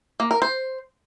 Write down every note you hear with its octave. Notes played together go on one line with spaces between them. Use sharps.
A#3
A#4
C5